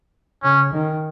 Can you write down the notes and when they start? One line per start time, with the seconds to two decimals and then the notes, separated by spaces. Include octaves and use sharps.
0.43 C#3 C#4
0.73 D#3